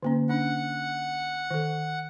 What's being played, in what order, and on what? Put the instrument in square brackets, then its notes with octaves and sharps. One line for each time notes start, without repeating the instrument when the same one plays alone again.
[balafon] D3 A#3 C#4
[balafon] C#4 D4 [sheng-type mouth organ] F#5
[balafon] D#3 A4